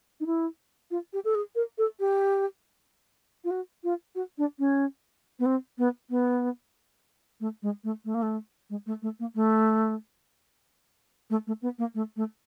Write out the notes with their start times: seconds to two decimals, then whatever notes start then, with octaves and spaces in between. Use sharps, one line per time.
0.20 D#4
0.26 E4
0.91 F4
1.13 G4
1.24 A4
1.35 G#4
1.55 A#4
1.78 A4
2.00 G4
3.44 F4
3.51 F#4
3.84 F4
4.15 F#4
4.38 D4
4.59 C#4
5.39 B3
5.46 C4
5.78 B3
6.10 B3
7.40 A3
7.62 G#3
7.84 A3
8.05 A3
8.14 A#3
8.22 A3
8.70 G#3
8.86 A3
9.02 A3
9.19 A#3
9.35 A3
11.30 A3
11.47 A3
11.62 B3
11.78 A#3
11.95 A3
12.16 A3